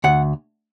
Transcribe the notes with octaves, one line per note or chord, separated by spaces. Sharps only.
D2 F#5